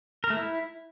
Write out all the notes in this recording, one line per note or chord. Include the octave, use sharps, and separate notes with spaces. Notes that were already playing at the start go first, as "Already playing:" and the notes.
A#4
A3
E4